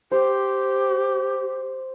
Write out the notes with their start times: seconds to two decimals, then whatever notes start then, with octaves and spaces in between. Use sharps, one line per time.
0.12 G4 C5